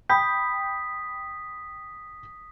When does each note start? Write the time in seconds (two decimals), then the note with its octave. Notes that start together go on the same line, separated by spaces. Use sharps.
0.10 G5 B5 D#6 G6 B6